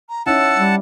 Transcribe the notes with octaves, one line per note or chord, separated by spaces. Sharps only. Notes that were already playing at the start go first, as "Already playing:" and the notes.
A#5
C#4 D#4 E4 F#5 A5 E6
G3